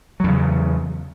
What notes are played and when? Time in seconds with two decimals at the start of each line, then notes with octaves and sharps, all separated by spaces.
0.20 F#3
0.24 E2
0.28 C#3